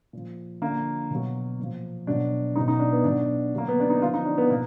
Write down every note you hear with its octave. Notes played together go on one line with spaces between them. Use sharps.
A#2 F3
D3 F3 A#3
B2 F#3
A#2 F3
B2 F#3 D4
B2 F#3 D#4
D#4
D4
B3
B2 F#3 D4
D3 F#3 A#3
B3
D4
D#4
D3 F3 F4
D#4
D4
B3
B2 A#3